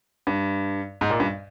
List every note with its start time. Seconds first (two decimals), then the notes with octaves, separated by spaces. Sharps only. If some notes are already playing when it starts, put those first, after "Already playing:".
0.27 G2
1.01 G#2
1.10 A#2
1.20 G2